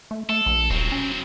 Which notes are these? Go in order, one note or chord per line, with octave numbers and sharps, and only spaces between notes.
A3
A3 A4
A#1
D#1 F#3 C4
C#4